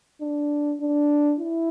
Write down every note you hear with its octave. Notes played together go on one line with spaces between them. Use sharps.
D4
D4
E4